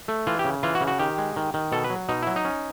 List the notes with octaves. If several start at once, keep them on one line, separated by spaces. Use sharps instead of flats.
A3
E3 F4
G4
C#3
E3 F4
F#4
C#3
F#4
D#3 G4
G#3
D#3
D#3
B2 A4
B4
F#3
B2 D#4
F#3 E4
D#4
C#4